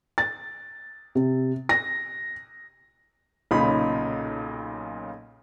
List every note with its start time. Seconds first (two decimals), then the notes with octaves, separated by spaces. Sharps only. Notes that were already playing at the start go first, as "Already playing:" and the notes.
0.18 A6
1.15 C3
1.69 A#6
3.51 B1 A#2 C#3 D#4 B5